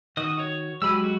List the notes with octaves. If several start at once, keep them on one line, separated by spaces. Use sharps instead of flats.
D#3 F#4 D#5 D#6
F#4 C#5
F#3 G#3 G4 G#5 B5 E6
F#4